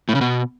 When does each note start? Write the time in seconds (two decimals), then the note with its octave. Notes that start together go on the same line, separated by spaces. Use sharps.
0.09 A2
0.15 C#3
0.21 B2